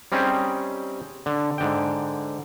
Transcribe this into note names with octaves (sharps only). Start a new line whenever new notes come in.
G3 C4 C#4 D#4 G4 G#4
D3
G#2 D3 G5